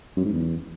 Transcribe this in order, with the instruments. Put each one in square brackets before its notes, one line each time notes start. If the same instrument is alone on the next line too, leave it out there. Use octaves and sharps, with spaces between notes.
[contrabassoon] F#2
G#2
E2